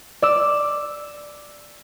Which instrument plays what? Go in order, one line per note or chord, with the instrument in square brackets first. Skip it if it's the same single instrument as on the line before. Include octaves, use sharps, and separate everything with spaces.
[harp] D5 E6